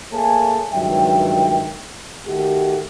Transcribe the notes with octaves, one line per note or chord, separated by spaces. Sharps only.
A3 A#3 G#4 C#5 G#5 A5
C#2 G2 D#3 F#3 E5 G5
D#3 A3 F#4 G4